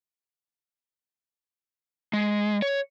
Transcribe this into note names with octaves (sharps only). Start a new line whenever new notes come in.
G#3
C#5